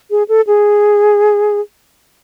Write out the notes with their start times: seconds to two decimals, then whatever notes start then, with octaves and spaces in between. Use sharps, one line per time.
0.11 G#4
0.29 A4
0.47 G#4